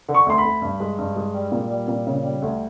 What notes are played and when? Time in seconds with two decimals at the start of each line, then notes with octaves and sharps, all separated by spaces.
0.09 D3
0.14 C#6
0.26 D2 C6
0.38 B5
0.44 D2
0.62 G2
0.80 G#3
0.98 G2
1.16 G#3
1.34 G3
1.52 A#2
1.70 G3
1.88 A#2
2.07 C#3
2.24 G3
2.42 D2